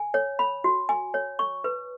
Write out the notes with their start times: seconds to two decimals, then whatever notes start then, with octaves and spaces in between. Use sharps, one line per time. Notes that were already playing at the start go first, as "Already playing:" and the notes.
Already playing: G#5
0.14 C#5
0.39 B5
0.64 F#4
0.89 G#5
1.14 C#5
1.39 C#6
1.64 B4